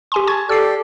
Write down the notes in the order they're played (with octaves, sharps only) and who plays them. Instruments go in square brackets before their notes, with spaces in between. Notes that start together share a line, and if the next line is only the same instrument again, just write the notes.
[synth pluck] G4 G#5 C6
[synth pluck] G#5 C#6 G#6 [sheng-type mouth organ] A5
[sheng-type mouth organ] G4 A4 D5 [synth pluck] E6 C7